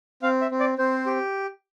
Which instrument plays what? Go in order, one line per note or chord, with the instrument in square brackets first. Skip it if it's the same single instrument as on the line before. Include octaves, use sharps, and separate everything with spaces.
[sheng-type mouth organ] C4 F5
E5
C4
D5
C4 C5
G4